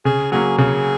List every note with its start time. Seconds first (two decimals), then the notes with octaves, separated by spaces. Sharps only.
0.05 C#3 G#4
0.32 F#3 A#3 C#4 G#4
0.58 C#3 G#4